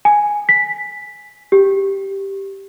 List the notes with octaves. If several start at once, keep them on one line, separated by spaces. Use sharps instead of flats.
G#5
B6
G4